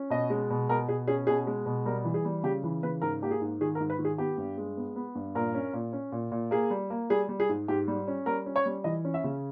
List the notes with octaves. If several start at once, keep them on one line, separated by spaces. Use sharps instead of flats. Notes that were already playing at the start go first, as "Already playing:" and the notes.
Already playing: C#4
B2 D#5
G#3
B2
B2 A#4
B2 G#4
C#4 G#4
B2 G#4
G#3
B2
G3 A#4
E3
G#4
G3
C#3 G4
E3
C#3 B4
G#2 A#4
A#3 G4
G#4
G#2
D#3 G#4
A#4
G#2
B4
D#3
G#4
B3 G4
G2
G#3
B3
B3
G2
A#2 A#4
C#4
A#2
C#4
A#2
A#2
A#3 G#4
G3
A#3
G3 G#4
G3
G#4
G#2
G#2 G4
G3
C#4
G3 A#4
C#4
C#5
G3
E3 D#5
C#4
E5
C#3